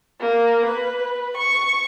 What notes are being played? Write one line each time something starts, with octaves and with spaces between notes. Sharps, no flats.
A#3
B4
C#6